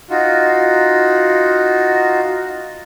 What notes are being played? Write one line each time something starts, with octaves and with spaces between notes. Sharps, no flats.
D#4 F4 F#4